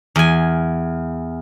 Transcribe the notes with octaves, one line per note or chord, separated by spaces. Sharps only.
E2 G#5